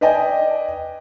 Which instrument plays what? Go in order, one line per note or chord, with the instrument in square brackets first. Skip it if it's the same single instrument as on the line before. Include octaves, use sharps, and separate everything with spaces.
[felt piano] B4 D5 D#5 G5 G#5